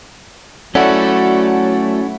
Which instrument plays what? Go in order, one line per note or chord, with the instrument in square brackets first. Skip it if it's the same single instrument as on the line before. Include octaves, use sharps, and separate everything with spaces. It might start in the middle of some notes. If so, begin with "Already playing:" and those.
[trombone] F#3 [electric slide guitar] A3 [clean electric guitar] C#4 E4 F#4 [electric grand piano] A4 D5 F#5